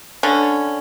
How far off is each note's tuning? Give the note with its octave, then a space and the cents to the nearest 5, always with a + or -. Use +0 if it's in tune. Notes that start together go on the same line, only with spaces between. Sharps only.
D3 +0 C#4 +0